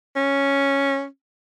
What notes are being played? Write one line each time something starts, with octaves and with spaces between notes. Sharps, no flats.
C#4